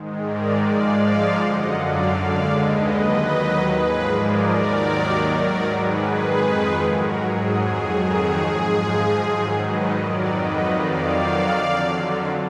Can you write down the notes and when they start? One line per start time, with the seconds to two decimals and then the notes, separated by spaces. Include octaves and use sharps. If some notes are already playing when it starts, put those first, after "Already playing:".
Already playing: G#2 D#3 G#3
0.22 A#4 D5
0.61 G#2 F3 G#3 D5 F5
1.00 D5 F5
1.39 F#2 D3 F#3 D#5 F#5
1.78 D5 F5
2.17 D#2 D3 G#3 D5 F5
2.55 B4 D#5
2.95 D#2 D#3 F#3
3.72 G#2 F3 G#3 G#4 B4
4.11 A#4 D5
4.50 D#2 D#3 F#3
5.28 G#2 D#3 F#3 A#4 D5
5.67 G#4 B4
6.06 F2 D#3 G#3
6.83 G#2 F#3 F#4 A#4
7.23 G#4
7.61 F2 D#3 F#3 G#4
8.00 G#4
8.39 G#2 F3 G#3
9.17 G#2 D#3 F#3
9.56 B4 D#5
9.95 F2 D#3 F#3 A#4 D5
10.34 B4 D#5
10.72 F2 D#3 F#3 D5 F5
11.51 F2 D3 F#3